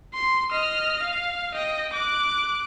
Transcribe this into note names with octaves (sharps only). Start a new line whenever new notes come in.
C6
D#5 F6
F5
D#5 G5
D6 F#6